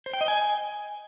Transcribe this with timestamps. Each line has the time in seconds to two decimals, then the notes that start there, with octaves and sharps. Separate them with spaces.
0.06 C5
0.13 G5
0.21 D#5
0.28 G#5